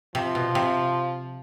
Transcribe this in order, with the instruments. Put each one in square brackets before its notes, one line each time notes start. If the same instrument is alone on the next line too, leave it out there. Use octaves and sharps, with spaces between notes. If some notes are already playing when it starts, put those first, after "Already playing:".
[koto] C3 [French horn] F3
[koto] B2
C3